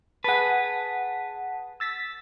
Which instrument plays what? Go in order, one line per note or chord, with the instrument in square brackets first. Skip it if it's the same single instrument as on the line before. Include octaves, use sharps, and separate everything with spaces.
[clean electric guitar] G#4 B4 [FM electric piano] F#5 A5
[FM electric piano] E6 A6 B6